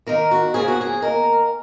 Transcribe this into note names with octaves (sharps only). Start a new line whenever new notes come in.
D#3 A#3 A#4
F#4
C#3 F3 A#3 G#4
F#4
G#4
D#3 A#3 A#4